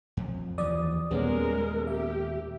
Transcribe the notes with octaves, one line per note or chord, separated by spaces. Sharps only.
F2
D#2 E3 F3 D5 D#6
D#2 A#2 D#3 G3 G#3 B3 C#4 A#4
G4 E5